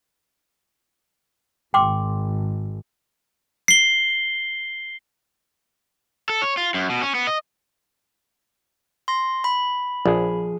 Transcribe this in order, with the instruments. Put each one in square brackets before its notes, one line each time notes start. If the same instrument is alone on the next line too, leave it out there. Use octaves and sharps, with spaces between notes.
[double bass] G#1 [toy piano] G5 C6 D6
[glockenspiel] C7 G7
[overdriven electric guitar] A4
C#5
F4
F#2
B2
C#4
B3
D#5
[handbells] C6 A#6
B5
[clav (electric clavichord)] A#1 [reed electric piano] F3 G#4